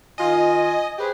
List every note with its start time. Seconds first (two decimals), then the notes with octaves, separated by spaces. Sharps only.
0.18 D#3 F4 D#5 G#5
0.98 G4 G#4 B4 C5